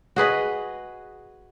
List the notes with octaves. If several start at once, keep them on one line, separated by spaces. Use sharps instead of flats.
F#4 G#4 B4 D#5